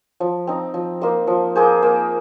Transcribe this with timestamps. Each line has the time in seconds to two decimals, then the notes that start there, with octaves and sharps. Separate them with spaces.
0.20 F3
0.47 C4 D#4
0.74 F3
1.01 A#3 D#4 C5
1.27 F3
1.56 A#3 G#4 C5
1.82 A#3